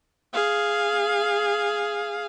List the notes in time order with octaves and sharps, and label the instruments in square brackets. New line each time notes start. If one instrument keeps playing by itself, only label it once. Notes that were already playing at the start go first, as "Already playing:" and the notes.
[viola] G#4 F5